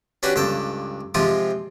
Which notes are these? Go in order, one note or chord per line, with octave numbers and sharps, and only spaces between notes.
C#4 D4 F#4 G4 B4
C#2 G2 A4 G5
C3 F3 G#3 F4 G4